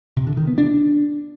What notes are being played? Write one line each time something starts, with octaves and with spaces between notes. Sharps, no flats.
C3
D3
D#3
B3
D4